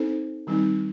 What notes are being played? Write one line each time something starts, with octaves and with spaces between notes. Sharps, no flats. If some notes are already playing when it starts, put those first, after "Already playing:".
Already playing: C4 D#4 A4 C5
D#3 G3 C4 D#4